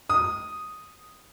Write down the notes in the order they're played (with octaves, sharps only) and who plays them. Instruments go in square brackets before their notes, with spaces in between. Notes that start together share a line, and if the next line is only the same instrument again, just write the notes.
[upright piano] D#6